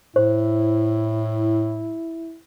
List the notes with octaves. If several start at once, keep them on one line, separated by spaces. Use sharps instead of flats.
A2 E4 C5